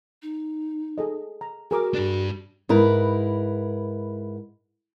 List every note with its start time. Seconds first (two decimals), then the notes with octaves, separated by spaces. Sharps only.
0.22 D#4
0.98 G#4 A4 D#5
1.41 A#5
1.71 F#4 G#4 A#4 D6
1.94 G2 D4
2.69 G#2 E4 A#4 B4